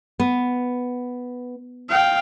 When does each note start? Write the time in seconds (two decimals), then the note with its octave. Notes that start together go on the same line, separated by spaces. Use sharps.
0.20 B3
1.89 F5 G5